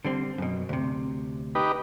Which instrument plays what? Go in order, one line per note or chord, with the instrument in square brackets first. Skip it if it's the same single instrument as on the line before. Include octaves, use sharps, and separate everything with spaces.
[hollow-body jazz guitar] D3 G3 C4
F#2 B2
D2 C3
[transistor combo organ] D#4 G4 B4